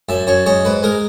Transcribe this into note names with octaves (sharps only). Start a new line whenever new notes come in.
F#2 E5
F#2 C#5
G#3 C#5
G#2 B4
G#3 A#4